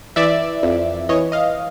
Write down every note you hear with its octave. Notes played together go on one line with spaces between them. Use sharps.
E3 D5 E5
F2
E3 C#5 D#5
D#5 F5